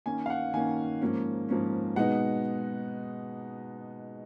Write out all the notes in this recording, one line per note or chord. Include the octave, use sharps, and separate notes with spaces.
D#3 A#3 C#4 G#5
F5
F#5
D#3 A#3 C#4 G#5
G#2 F3 A#3 C#4
G#2 F3 A#3 C#4
B2 G#3 B3 D#4 F#5